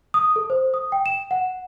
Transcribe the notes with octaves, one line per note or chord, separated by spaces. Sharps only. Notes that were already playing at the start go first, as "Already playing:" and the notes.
D#6
A4
C5
D#6
G5
E7
F#5